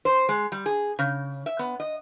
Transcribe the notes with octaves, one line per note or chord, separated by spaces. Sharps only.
C5
G#3
G3
G#4
C#3
E5
B3
D#5